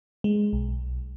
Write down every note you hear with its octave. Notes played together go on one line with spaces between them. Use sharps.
G#3
B1